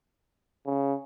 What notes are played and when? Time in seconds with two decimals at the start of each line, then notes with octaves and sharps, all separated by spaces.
0.66 C#3